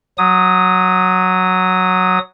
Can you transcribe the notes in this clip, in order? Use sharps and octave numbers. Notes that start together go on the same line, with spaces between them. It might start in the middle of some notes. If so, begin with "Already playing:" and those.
F#3 D#6